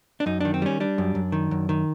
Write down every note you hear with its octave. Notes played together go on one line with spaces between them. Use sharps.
D4
F#2 D#4
D#3 D4
C4
G3 C#4
G3 D4
F#2
F#2
D#3
F#2
D#3